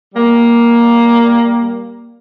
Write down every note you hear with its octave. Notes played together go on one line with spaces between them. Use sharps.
G3 A#3